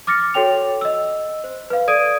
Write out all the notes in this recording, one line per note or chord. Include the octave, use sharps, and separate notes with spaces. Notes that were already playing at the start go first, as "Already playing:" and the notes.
D6 F6 A6 A#6 C#7
F#4 A4 C#5 G5 F7
D#5 E6
C5
B4 F5
A4 D5 D#6 G#6 D7 D#7